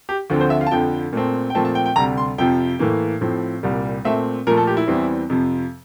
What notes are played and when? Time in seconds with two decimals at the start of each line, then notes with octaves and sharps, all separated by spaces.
0.09 G4
0.30 D2 D3 F3 C4
0.41 C5
0.50 E5
0.61 F5
0.67 A5
0.71 F2 D3 F3 G5
1.13 A#2 A3 C4
1.50 G5
1.55 A#2 F3 A3 C4 A5
1.65 A5
1.75 G5
1.86 G5
1.96 D2 C3 G3 A#5
2.17 C6
2.38 F2 C3 F3 G5
2.79 A2 E3 A#3
3.21 A2 F3 C4
3.63 C2 A#2 G3
4.05 A#2 A3 C4 E5
4.47 A#2 F3 A3 A#4
4.57 A4
4.67 G4
4.77 E4
4.87 E2 E3 G3 C4
5.30 F2 C3 F3